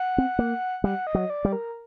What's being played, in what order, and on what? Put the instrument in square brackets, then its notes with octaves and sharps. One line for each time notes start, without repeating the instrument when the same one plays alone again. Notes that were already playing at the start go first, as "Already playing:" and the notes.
Already playing: [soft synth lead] F#5
[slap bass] C4
A#3
[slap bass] G3 [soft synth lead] F#5
[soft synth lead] D#5
[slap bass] F#3
[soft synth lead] D5
[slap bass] G3
[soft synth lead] A#4